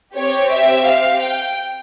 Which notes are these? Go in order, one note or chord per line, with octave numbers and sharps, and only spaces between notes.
C4 G4 C#5
E5
F5
G5